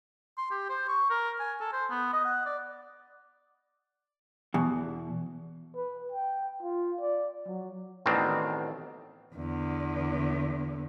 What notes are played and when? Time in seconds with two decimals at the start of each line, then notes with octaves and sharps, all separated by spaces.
0.38 C6
0.51 G4
0.69 C5
0.89 C#6
1.10 A#4
1.40 G#5
1.61 A4
1.73 C5
1.90 B3
2.13 D#5
2.25 F#5
2.46 D5
4.54 E2 B2
5.76 B4
6.12 G5
6.63 F4
7.01 D5
7.47 F#3
8.06 A1 B2 D#3 C4 D4
9.36 E2 D3